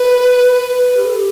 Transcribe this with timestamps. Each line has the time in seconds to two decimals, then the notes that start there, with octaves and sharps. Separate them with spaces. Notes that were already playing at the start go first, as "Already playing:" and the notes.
Already playing: B4
0.54 B4
0.97 G4
1.06 A4
1.13 G4